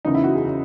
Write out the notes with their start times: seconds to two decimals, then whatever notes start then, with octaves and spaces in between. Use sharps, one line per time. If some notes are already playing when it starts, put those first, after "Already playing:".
0.05 F#1 E2 C#3 D#4
0.15 E4
0.24 F#4
0.34 G#4
0.44 C#3